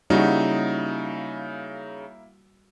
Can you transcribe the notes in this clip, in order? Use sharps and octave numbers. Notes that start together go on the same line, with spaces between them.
C#3 G3 A#3 D#4 E4 F#4